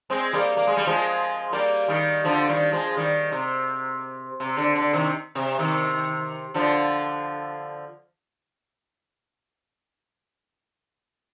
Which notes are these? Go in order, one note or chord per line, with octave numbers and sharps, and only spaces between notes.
G#3 C4
G3 A#3
A#3
G#3
G3
F3 G#3
G3 A#3
D#3 G3
D3 F3
D#3 G3
F3 G#3
D#3 G3
C3
C3
D3
D3
C3 D#3
C3
C3 D#3
D3 F3